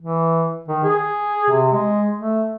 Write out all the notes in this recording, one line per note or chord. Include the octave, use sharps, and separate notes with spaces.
E3
D#3
G#4
C3
G#3
A3